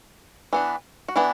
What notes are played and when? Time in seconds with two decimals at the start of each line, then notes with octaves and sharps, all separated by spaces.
0.53 E3 B3 D4
1.08 F#4
1.16 E3 B3 D4 E4